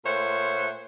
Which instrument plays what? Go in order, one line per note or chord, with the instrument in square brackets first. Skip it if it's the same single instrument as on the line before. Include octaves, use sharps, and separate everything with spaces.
[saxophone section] A#2 A3 C5 C#5 F#5